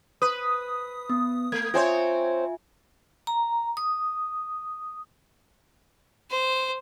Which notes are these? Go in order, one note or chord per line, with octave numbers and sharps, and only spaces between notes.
B4 D#6
B3
A3 G#6
C4 F4 C5 C#5 E5 G#5
A#5
D#6
C5